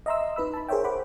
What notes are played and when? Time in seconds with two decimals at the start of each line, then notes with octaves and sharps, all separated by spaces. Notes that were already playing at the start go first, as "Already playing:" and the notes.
0.06 D#5 E5 A#5 C6 E6
0.36 D#4 B4 B5 E6
0.54 A5 B5
0.68 G#4 A#4 C5 C#5 E5 G5
0.84 C5 F#5 B5 D6